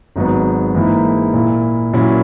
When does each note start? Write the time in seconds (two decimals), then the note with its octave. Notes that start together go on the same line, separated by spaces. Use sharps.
0.16 G#1 G#2 F#3 B3
0.75 G#2 E3 A#3 E4
1.34 A#2 A#3 E4
1.93 A#2 F#3 C#4 E4